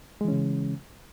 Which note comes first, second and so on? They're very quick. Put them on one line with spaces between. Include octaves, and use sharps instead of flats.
G#3 E3 C#4 C#3